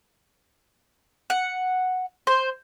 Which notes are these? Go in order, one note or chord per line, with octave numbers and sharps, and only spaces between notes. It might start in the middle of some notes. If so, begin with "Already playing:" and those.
F#5
C5